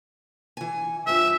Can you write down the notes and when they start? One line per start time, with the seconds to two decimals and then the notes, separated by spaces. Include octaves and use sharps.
0.57 E3 G#5
1.07 G2 F3 E5